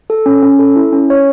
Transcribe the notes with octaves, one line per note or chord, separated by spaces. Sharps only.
A4
C#4
C#4
A4
E4
C#4
C#5